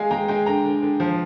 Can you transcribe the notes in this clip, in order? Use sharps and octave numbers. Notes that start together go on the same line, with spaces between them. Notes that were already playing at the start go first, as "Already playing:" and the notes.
Already playing: G#3 F5 G#5
G#3 G5 A#5
G#3 G5
D3 G5 A#5
D3
D3
F3